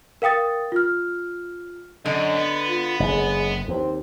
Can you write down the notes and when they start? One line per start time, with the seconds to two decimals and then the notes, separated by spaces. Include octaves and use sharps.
0.22 A#4 F5 G5 D#6 A6
0.72 F4 F6
2.06 F#2 D3 D#5
2.36 B3
2.68 F4
3.00 F#1 G#3
3.68 D#2 C4